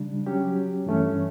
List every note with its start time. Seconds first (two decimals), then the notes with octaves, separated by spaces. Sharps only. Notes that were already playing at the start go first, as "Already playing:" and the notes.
Already playing: C#3 G3 D4
0.26 F#3 C#4 G4
0.86 G2 E3 A3 C#4